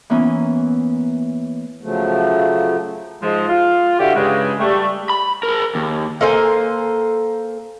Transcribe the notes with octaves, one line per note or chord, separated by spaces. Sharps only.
E3 A#3 B3 C#4 E4
C#3 F3 F#3 A3
G#2 F3 G#3
F4
D3 E4 F#4 G4
G2 C#3 G#3
G3 A3
B5
G#4 A#4
D#2
A#3 A4 C5 G#5